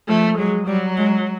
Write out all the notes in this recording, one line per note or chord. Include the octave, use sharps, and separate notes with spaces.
F3 A3
F#3 G#3
F#3 G3
G#3